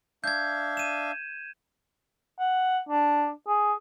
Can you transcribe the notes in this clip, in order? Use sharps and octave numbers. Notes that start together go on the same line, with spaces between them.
D4 E5 F5 G6 G#6
D#7 E7
F#5
D4
G#4